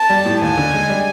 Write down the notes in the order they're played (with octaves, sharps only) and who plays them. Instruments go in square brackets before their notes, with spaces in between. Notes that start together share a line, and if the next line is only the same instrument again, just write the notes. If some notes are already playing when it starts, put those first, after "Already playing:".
Already playing: [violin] A5
[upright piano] G3
A2
[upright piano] D#2 [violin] G#5
[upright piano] D3
G#3
G3